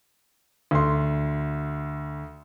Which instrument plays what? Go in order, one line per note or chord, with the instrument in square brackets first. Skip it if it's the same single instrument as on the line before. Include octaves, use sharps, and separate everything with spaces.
[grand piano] D2 C6